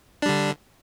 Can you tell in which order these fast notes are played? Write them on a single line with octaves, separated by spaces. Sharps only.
D4 G3 D3